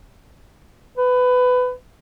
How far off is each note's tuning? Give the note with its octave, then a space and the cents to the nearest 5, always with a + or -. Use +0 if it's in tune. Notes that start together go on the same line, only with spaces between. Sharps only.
B4 +20